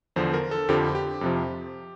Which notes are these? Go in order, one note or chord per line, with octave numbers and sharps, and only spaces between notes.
E2 D3 F3 C5
A#4
A4
F2 D3 F3 G4
G4
F2 C3 F3